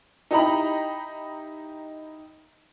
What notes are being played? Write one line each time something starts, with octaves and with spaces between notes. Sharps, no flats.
D#4 E4 G4 D#5 A#5 B5